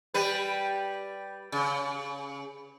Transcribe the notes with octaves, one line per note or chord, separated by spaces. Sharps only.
G3 B4
C#3